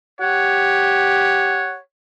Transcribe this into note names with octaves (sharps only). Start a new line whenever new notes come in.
G4 C#5 F#5